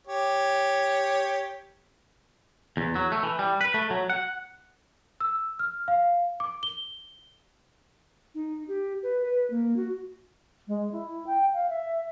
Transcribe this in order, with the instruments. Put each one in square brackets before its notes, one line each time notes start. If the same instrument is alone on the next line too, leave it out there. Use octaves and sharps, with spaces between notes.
[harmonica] G4 C#5
[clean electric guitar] E2
F#3
A3
E3
G3
B4
A3
F#3
F#5
[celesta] E6
F6
F5
D6
G7
[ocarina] D#4
G4
B4
B4
A#3
F#4
[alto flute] G#3
E4
G5
F5
E5